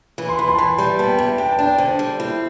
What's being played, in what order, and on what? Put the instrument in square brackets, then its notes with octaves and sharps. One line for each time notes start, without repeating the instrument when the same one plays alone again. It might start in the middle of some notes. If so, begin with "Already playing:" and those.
[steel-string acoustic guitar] E3
[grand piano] C6
[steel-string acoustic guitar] E3 [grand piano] B5
[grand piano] C6
A5
[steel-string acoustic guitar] E3 [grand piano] B5
[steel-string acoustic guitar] G3
[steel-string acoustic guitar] B3 [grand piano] A5
[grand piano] G5
[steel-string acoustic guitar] C3 [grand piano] A5
[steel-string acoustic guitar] D4 [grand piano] G5
[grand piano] A5
[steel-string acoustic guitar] D4
[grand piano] G5
[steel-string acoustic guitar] D3 [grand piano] C5
[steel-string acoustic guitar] G3
[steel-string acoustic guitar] C4 [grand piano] E4